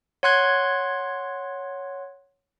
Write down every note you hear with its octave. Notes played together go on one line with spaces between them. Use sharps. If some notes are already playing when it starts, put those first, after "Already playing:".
C#5 F#5 C6 F#6 G#6